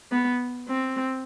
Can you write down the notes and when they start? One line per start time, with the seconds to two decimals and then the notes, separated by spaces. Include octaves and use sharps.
0.12 B3
0.68 C4